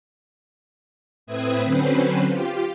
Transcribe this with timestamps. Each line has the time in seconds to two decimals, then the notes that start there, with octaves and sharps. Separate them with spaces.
1.27 A2 C4 B4 E5 D#6 G#6
1.64 D3 F#3 C4 C#4 B4 C5
2.28 F4 G4